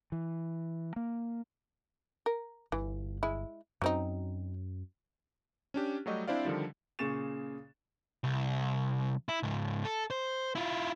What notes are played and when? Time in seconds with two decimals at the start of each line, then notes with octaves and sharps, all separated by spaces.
0.12 E3
0.96 A#3
2.26 A#4
2.72 G1 E3
3.23 G#3 E4
3.82 F#2 F#3 C4 C#4 D#4
5.74 C#4 D4 G4
6.06 F#3 G3 A3 F#4 G4 D#5
6.27 C4 D4 E4 C5 D5 F5
6.45 D3 D#3 F3 G3
6.99 A#2 C#3 G#4 C#6 A6 E7
8.24 C2
9.29 E4
9.43 C#2 G#2
9.85 A4
10.10 C5
10.55 E4 F4